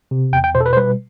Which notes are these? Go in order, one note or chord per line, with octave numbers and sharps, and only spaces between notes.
C3
E2 G5
G5
B2 C5
A4
B4
C5
G3 B4